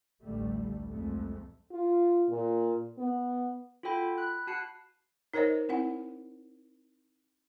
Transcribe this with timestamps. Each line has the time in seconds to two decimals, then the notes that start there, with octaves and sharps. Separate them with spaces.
0.24 A1 D2 G3 A3
0.88 C2 F2 G#3 A3
1.72 F4
2.29 A#2
2.98 B3
3.83 F4 F#4 A4 G5 B5
4.18 B5 F#6
4.47 F#4 A5 F#6 C7 C#7
5.34 D#4 A#4 C5 C#5 D#5
5.69 C4 E4 F#5